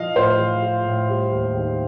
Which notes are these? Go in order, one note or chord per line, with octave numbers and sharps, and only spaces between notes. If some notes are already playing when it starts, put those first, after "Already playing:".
Already playing: F3 F4 D#5 F5
A2 C5
F3
F4
A2
G3
D#2
D#3